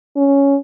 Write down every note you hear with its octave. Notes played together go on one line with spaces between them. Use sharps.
C#4